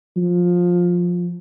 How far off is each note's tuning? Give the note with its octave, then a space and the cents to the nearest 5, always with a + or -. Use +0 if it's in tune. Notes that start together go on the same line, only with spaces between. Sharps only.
F3 +15